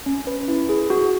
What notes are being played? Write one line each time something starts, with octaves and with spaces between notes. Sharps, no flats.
C#4
B4
E4
G#4
F#4